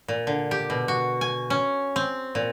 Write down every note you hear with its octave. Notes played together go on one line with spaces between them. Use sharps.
A#2
D3
G4
B2
F#4
G#5
C#4
C4
A#2